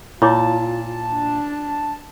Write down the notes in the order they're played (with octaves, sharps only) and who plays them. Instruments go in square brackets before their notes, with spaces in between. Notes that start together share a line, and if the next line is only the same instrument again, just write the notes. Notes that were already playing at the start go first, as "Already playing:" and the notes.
[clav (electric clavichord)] A#2 [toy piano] E4 C#5 D6 [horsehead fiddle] F4 [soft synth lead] A5
[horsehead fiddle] D4